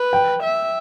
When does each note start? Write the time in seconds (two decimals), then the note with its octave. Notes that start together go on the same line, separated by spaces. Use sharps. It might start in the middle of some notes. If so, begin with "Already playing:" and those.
Already playing: B4
0.13 G5
0.43 E5